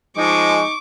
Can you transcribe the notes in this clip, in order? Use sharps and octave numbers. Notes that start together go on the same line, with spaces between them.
F3 G#3 D#4 C#6 D6